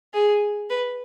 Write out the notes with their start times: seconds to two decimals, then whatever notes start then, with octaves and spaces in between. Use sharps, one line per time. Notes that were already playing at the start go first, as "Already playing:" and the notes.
0.14 G#4
0.70 B4